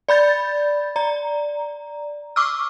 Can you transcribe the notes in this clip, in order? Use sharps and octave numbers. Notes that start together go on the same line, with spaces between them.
D5 B5 G6 A6
D5 A#5
C#6 D6 E6 F6